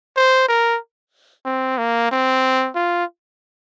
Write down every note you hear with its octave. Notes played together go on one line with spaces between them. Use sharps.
C5
A#4
C4
A#3
C4
F4